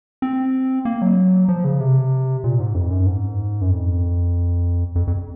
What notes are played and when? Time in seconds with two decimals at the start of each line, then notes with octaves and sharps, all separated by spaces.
0.22 C4
0.85 A#3
1.02 F#3
1.48 F3
1.64 C#3
1.80 C3
2.44 A#2
2.60 G#2
2.75 F2
2.91 F#2
3.06 G#2
3.61 F#2
3.70 F2
4.95 F2
5.07 F2